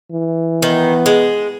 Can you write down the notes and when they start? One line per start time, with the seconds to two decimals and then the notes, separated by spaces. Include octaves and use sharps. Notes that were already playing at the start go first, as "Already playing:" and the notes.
0.11 E3
0.62 D#3 B3
1.06 G#3